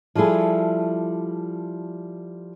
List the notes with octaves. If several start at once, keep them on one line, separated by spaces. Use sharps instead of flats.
F3 G3 E4 G#4 A4